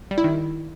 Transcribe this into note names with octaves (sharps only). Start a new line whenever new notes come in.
G3
E4
D#3